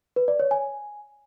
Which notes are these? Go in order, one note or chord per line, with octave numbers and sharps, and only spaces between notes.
B4
D5
C#5
G#5